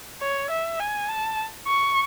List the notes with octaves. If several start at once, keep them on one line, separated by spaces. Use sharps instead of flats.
C#5
E5
G#5
A5
C#6